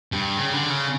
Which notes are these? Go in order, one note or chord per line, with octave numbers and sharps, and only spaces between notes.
G2
C#3
D3
C#3